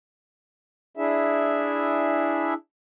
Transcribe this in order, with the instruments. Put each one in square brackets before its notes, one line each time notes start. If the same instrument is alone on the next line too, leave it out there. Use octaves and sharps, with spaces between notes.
[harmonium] D4 E4 G#4 E5